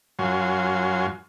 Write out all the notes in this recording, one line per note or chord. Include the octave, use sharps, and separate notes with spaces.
F#2 F#3 F4 G#5 C6